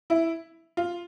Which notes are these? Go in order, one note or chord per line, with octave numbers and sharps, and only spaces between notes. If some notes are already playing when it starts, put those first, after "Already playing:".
E4
F4